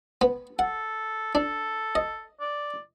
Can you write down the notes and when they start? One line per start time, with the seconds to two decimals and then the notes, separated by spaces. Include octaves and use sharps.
0.21 B3
0.59 A4 F#5
1.35 D4 A4
1.95 D#5
2.41 D5